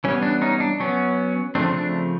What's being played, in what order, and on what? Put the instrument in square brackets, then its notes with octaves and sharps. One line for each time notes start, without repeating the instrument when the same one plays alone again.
[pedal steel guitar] E3 G3 B3 C#4
D4
C#4 D#4
D4
F#3 B3 C#4
C#3 F3 A3 C4 D4
D4